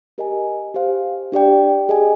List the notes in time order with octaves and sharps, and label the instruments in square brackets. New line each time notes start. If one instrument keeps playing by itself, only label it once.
[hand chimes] G4 A#4 D#5 G#5
G4 C5 F5
D4 G4 D5 G5
G#4 D#5 G#5